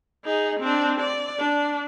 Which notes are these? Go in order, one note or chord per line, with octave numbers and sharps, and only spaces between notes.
D#4 G#4
C4 D4
D5
D4